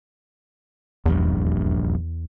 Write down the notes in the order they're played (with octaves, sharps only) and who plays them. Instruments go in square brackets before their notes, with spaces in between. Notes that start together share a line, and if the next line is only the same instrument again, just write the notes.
[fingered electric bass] D#1 A#1 G2 [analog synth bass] E2